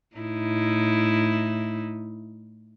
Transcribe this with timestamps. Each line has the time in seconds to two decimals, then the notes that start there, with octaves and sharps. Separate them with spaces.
0.16 A2 D#4 E4